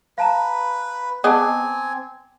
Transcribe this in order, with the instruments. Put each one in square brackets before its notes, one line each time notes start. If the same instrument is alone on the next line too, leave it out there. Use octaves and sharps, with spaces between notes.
[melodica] B4 [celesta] F5 A5 A#5
[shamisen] B3 G#4 D#5 [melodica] C4 G#5 [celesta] A5 D6 D#6